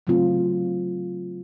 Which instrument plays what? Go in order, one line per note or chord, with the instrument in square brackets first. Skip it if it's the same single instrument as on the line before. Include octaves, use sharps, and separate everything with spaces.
[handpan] C#3 F#3 A3 C4 F4